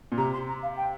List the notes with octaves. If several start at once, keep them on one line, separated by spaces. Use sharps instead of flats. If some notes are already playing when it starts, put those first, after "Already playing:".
A#2
C3 A#5
C6
A#5
F5
G5